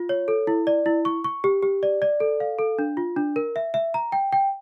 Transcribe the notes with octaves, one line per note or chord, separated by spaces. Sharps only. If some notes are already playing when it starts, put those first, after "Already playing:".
Already playing: F4
C#5
A4
E4
D5
E4
C#6
C#6
G4
G4
D5
D5
A4
F5
A4
D4
F4
D4
A#4
E5
E5
A#5
G5
G5